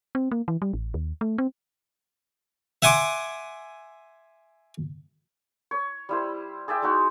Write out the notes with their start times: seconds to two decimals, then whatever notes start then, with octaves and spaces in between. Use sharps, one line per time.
0.15 C4
0.32 A#3
0.48 E3
0.62 G3
0.73 A1
0.94 D#2
1.21 A3
1.38 C4
2.82 E5 F#5 G#5 C6 D6
5.71 C#5
6.09 G3 E4 C5
6.68 G#4 D5 E5 G5
6.82 G#3 D#4 F#4